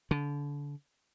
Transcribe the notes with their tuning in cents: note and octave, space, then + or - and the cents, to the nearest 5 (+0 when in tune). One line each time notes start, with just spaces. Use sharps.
D3 -30